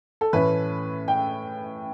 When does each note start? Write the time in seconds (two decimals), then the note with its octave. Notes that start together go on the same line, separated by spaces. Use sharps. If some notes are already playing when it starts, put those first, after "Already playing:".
0.21 A4
0.33 A2 E3 A3 C#4 B4
1.08 G5